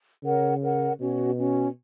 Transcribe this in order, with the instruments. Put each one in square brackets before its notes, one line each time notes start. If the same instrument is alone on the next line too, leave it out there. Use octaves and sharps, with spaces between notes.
[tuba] C#3 [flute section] A#4 C#5 F#5
[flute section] A#4 C#5 F#5
[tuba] B2 [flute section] C#4 F#4 C#5
[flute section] C#4 F#4 C#5